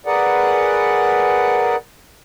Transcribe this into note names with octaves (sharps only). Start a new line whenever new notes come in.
G#4 A#4 B4 D5 F#5